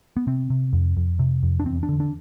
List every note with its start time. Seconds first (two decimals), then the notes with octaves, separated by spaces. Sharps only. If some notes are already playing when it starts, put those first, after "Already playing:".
0.17 B3
0.27 C3 C4
0.50 C3
0.73 F2
0.97 F2
1.19 C3
1.43 F2
1.60 D4
1.65 E2 C4
1.83 D4
1.89 D3
2.00 D4